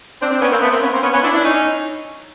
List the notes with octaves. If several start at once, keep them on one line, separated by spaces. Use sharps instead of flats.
C4 D4
C4 D4
B3 C#4
A#3 C4
A3 B3
A#3 C4
B3 C#4
A#3 C4
B3 C#4
B3 C#4
D4 E4
D4 E4
C#4 D#4